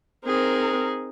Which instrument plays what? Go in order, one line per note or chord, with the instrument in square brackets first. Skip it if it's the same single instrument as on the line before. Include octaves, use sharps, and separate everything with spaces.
[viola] C4 A#4 [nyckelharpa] D#4 G#4